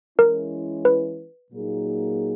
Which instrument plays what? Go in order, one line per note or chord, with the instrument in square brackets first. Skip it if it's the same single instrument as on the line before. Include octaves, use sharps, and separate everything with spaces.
[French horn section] E3 G#3 C#4 E4 [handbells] A#4
[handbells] B4
[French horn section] A#2 F#3 A#3 D#4 G#4